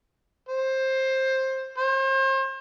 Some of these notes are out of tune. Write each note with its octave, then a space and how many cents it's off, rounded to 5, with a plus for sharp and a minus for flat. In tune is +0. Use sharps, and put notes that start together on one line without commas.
C5 +15
C5 +40